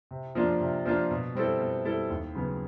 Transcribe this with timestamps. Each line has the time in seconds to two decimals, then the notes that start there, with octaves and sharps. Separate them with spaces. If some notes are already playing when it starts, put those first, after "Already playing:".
0.11 C3
0.35 F3 A#3 D4 F4
0.61 C3
0.85 F3 A#3 D4 F4
1.11 B2
1.35 G3 C4 E4 A4
1.60 B2
1.85 G3 C4 E4 A4
2.10 D#2
2.35 C#3 F#3 B3